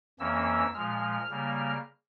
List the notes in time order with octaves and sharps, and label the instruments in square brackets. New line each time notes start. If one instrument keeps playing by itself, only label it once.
[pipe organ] F2 E3 A#3 C#4 E6
A#2 F3 G#3 F6
C#3 G3 A#3